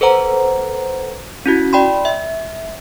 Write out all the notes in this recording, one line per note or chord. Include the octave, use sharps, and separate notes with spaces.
A4 B4 C5 F#5 A#5
C#4 E4 F#4
D5 G5 B5 C6
E5